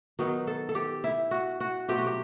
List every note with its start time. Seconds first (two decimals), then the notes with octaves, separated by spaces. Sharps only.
0.19 D#3 F#3 B3 D#4
0.47 A4
0.69 A4
0.75 G4
1.04 E4
1.31 F#4
1.60 F#4
1.88 B2 F#3 A3 C4 G4
1.98 F#4
2.07 G4